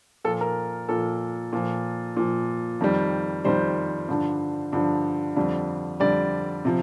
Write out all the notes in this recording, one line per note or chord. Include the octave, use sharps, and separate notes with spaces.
A#2 F3 A4
A#4
A#2 F3 A4
A#2 F3
A#2 F3
F2 D#3 G3
F2 D#3 G3 C5
G2 D3 F3
G2 D3 F3
F2 D3 G3
F2 D3 G3 D5
C3 F3